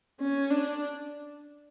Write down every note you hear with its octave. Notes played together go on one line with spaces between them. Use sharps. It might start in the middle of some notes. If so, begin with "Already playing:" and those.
C#4
D4